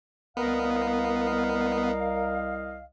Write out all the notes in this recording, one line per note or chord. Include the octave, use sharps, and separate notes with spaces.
C2 B3 A#4 D#5 F5